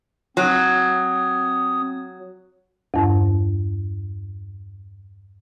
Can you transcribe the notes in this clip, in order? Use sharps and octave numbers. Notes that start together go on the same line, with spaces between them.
F#3 C4 D#6
E2 G2